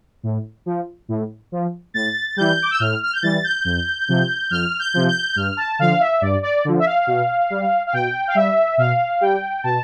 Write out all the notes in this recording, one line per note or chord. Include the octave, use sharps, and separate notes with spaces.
A2
F3
A2
F3
A2 A6
E3 G3 G6
D6
E6
A2 F6
F6
G6
E3 G3 A6
G6
F2
C3 F3
F2 F6
G6
C3 F3
G6
G2 F6
A5
D3 F3 F5
E5
G2 D5
D5
D3 F3
E5
F5
B2
G3
F5
B2 G5
F5
G3 E5
B2 F5
G3 G5
B2 A5